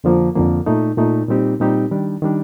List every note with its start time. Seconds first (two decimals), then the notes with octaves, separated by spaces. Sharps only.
0.04 F2 D3 F3 A#3
0.35 F2 D3 F3 A#3
0.66 A#2 A3 D#4
0.97 A#2 A3 D#4
1.28 A#2 G3 C4 D#4 G4
1.60 A#2 G3 C4 D#4 G4
1.91 D#3 G3 D4
2.22 D#3 G3 D4